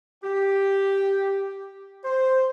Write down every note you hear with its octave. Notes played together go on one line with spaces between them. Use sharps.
G4
C5